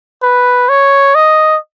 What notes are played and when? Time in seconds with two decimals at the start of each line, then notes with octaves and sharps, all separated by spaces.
0.23 B4
0.69 C#5
1.15 D#5